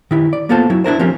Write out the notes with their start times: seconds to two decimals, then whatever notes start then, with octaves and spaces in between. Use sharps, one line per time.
0.11 D#3 E4 G4
0.33 D5
0.49 A#3 B3 F4 A4 C5 A5
0.70 F#3 C#4 E4
0.84 D4 E4 A#4 C5
0.99 F3 C4 C#4 G4 A#4